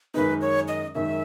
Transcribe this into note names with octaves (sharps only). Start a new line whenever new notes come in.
F#2 D#3 G#3 D#4 B4
C#5
D#5
F#2 D#3 G#3 D#4 E5